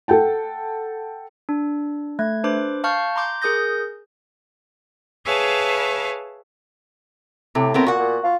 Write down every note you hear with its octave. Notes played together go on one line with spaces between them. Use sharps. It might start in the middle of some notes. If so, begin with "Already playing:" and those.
A4 F#5 G5 A5
D4
A3 G#6
D4 B4 C5 D6
F5 A5 C#6 F6 G6
A#5 C6 D6 G6
G#4 A#4 D#6 G6 A#6
G#4 B4 C#5 E5 F5 A5
A2 C3
B3 C4 A#4
A#2 F#4 F#5
A#2
F4